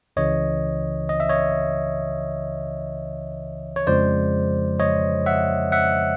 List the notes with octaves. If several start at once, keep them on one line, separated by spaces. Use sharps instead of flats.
C#2 C#3 E3 C#5 D#5
D#5
E5
C#5 D#5
C#5
F2 C#3 F3 G#3 C5 D5
C#5 D#5
E5 F#5
E5 F#5